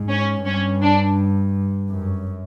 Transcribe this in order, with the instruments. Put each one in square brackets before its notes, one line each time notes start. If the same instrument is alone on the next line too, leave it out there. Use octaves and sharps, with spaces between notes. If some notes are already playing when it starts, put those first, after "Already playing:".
Already playing: [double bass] G#2
[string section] C#4
[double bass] G2 [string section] C#4
[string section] D4
[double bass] F#2